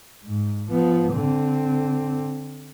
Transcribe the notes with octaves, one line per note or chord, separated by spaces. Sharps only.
G#2
F3 B3
D3 C4